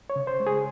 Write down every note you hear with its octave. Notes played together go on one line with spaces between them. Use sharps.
C#5
C#3
C5
G#3
G#4